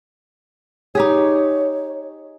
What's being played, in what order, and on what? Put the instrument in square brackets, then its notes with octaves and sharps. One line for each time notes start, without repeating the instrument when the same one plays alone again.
[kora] D#4 G4 G#4 [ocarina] C#5